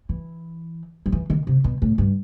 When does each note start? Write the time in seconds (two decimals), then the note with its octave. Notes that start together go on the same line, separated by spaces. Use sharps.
0.09 E3
1.06 F#3
1.12 E3
1.30 D#3
1.47 C3
1.64 B2
1.82 A2
1.98 G2